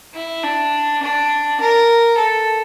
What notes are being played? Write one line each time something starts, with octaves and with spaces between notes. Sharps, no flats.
E4
D4
D4
A#4
A4